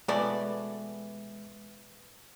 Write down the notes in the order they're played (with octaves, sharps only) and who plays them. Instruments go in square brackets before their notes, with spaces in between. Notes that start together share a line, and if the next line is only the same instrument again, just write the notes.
[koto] B2 A3 B3 [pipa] E3 D5 [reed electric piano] G#3